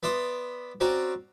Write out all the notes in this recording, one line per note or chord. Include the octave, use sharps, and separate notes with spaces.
B3 D5 E5 C6 D#6
C4 C#4 F#4 D5 A#5